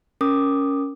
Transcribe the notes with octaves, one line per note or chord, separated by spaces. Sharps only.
C#4 A#4 D6 D#6